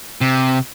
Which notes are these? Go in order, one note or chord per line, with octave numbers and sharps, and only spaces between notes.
C3